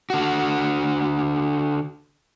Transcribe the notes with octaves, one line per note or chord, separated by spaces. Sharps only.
D3 F#4